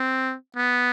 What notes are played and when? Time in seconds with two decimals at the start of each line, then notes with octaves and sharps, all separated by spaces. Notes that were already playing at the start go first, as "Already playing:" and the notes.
Already playing: C4
0.56 B3